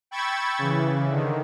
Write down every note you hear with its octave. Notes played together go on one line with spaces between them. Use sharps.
G5 B5 C#6 E6 G#6 A6
C#3 E3
D3 D#3